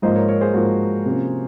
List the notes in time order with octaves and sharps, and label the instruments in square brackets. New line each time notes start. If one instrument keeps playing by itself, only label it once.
[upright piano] G#2 F3 A#3 [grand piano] C5 D#5
[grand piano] A#4 C#5
A#4 C#5
G#4 C5
[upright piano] G#2 F3 A#3 [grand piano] F#4
[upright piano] C3 F3 A#3 C#4